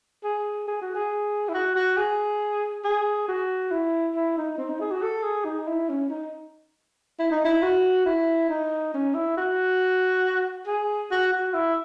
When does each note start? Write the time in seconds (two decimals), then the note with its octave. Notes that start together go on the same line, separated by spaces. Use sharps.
0.24 G#4
0.68 G#4
0.82 F#4
0.95 G#4
1.49 E4
1.54 F#4
1.76 F#4
1.97 G#4
2.84 G#4
3.29 F#4
3.71 E4
4.16 E4
4.37 D#4
4.58 C4
4.69 D#4
4.80 G#4
4.92 F#4
5.03 A4
5.24 G#4
5.45 D#4
5.68 E4
5.90 C#4
6.10 D#4
7.19 E4
7.31 D#4
7.45 E4
7.63 F#4
8.06 E4
8.50 D#4
8.94 C#4
9.15 E4
9.37 F#4
10.67 G#4
11.11 F#4
11.33 F#4
11.54 E4